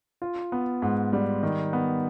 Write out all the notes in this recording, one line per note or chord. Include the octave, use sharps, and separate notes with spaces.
F4
B3
G#2
G3
D#3
B3